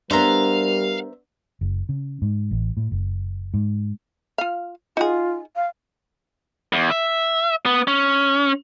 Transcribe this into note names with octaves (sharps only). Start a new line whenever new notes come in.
G3 B3 D4 A#4 C5 E5 F5 A#5
F#1
C#3
G#2
A1
A2
F#1
G#2
F4 F5
D#4 F4 F#4 G#4
F5
E2
E5
B3
C#4